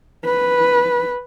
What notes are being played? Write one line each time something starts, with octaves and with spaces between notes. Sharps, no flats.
B4